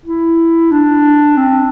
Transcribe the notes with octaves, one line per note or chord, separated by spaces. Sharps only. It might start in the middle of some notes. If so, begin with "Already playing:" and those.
E4
D4
C4